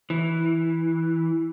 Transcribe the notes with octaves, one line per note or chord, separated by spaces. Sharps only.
E3